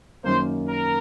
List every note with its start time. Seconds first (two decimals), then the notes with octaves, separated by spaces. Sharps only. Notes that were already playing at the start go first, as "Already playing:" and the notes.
0.24 F#2 D#3 A#3 C5
0.68 A#4